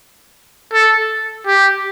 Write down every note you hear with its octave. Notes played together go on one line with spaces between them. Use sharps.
A4
G4